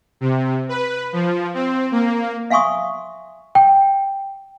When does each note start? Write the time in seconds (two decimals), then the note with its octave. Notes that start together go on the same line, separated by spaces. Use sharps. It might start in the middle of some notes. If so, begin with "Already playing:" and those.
0.21 C3
0.69 B4
1.13 F3
1.54 C4
1.92 A#3
2.50 E5 F5 G#5 C6 C#6 D#6
3.55 G5